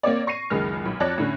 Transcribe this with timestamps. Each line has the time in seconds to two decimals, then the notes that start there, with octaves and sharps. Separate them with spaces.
0.03 A#3 C4 C#5 D5
0.27 C#6 A#6 C7 D#7
0.50 F#1 C#2 D#3 G#3 F6
0.85 B1
1.00 F2 C#5 D5 A5 F#6 A#6
1.18 A2 D3 C#4